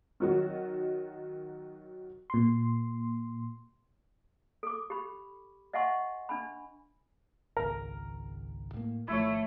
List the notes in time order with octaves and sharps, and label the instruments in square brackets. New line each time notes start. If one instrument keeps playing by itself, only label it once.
[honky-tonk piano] D#3 F#3 F#4
[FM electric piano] A#2 C6
[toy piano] A4 D6
G4 B5
D#5 E5 F#5 G#5 C6 C#6
D4 G#5 B5
[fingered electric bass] G#1 C#2 [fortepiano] A#4
[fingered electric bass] A2 A#3
[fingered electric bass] G#1 F3 [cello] A3 [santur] E4 C#5